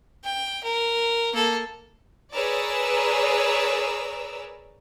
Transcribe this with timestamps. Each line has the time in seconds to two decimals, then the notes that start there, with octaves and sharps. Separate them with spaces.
0.24 G5
0.64 A#4
1.34 A#3 A4
2.34 G#4 A#4 B4 C#5 D5 E6